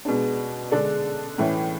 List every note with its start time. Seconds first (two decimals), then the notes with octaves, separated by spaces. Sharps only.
0.05 B2 G#3 D4
0.71 D3 G#3 D4 A4 D5
1.38 A2 E3 A3 C#4